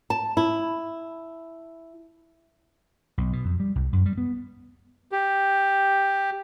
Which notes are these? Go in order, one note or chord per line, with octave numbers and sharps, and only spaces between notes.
A5
E4
B1
B2
F2
G3
C2
F#2
G3
B3
G4